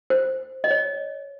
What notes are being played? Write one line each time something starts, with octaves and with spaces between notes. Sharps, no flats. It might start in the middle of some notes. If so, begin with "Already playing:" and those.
C5
D#5
C#5